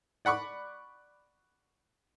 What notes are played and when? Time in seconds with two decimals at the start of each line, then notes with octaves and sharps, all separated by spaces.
0.25 D5 F#5 B5 C#6 D6